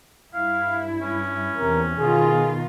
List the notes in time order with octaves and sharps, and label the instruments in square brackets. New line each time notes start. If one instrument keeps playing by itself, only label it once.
[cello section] G2 E4 [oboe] F5
[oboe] C#4
[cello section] E2 C3 [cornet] A#4
[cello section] B2 D#3 F4 [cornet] G#4